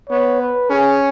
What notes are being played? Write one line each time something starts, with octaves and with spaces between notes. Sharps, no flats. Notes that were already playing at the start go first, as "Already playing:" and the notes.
B3 C#5
B4
C#4 G#4